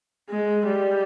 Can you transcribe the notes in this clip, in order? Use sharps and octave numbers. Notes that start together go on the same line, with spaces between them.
G#3
G3